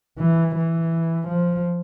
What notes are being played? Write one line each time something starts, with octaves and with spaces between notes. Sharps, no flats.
E3
E3
F3